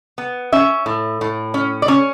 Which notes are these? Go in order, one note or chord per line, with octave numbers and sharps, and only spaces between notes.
B3
C#4 E5
A2
A2
C#4
D5
C#4 C#5